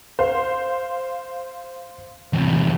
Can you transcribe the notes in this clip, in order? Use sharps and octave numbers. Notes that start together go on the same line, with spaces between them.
C5 F5
E2 C3